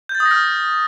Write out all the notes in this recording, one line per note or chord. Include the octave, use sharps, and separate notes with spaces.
G6
A6
D#6
A#6
F6